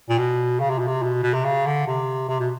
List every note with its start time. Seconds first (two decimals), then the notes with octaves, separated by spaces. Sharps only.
0.09 A#2
0.18 B2
0.60 C#3
0.70 C3
0.79 B2
0.88 C3
1.03 B2
1.23 B2
1.34 C3
1.44 C#3
1.66 D3
1.87 C3
2.28 C3
2.39 B2